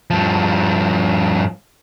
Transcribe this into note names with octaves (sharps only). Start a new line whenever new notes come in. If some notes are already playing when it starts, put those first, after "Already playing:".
G2 F3